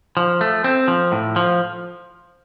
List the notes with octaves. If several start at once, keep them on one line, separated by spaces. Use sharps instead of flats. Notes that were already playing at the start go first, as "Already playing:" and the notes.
F3
A3
C4
F3
A2
F3